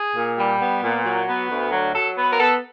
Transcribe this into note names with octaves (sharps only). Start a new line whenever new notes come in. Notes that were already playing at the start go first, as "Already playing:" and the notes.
Already playing: G#4
A#2
G3
B3
A#2
F#3
B3
D2
F#3
F#3 A4
B3 B4
A#4
B3 A4